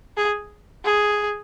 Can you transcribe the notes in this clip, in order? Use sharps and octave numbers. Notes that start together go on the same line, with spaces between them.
G#4
G#4